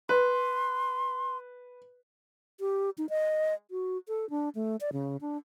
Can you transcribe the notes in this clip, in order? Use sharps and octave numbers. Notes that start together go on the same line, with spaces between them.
B4 C6
G4
D#4
D#5
F#4
A4
D4
A3
D5
C#3
D4